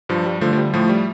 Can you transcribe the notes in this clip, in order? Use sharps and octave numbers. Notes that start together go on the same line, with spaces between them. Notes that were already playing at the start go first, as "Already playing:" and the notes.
G2 F3
G3
D3 F3 A3
F3
G3
A2 F3 A3
G3